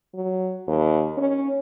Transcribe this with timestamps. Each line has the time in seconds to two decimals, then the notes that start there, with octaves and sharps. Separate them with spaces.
0.14 F#3
0.68 D#2
1.18 C#4